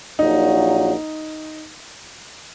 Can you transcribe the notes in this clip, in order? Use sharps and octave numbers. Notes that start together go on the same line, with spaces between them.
A#1 A#2 F#3 D#4